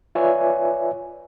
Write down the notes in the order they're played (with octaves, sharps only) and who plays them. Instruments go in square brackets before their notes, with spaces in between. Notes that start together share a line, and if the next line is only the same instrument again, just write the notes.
[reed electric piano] F4 B4 C#5 D5 E5 G#5